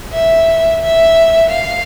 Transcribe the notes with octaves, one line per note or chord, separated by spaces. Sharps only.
E5
E5
F5